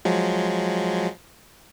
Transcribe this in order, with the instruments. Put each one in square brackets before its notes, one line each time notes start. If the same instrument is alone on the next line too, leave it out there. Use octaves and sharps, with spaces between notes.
[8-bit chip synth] F3 F#3 G#3